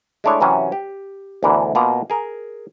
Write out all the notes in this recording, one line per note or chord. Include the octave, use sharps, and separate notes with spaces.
G#3 A3 D4 E4 C#5
C3 E3 F#3 C#4 G4
G4
D2 B2 D3 E3 A#4
B2 A#3 F4 A#5
G#4 A#4